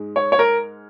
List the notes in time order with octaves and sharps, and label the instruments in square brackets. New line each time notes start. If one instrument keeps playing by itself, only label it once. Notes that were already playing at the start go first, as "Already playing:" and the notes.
Already playing: [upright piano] G#2 G#3
C#5
C#5
A#4